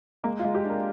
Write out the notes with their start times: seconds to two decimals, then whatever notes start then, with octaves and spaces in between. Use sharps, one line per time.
0.23 G#3 A#3
0.39 F4
0.44 G#3
0.55 G4
0.64 D4
0.70 A#4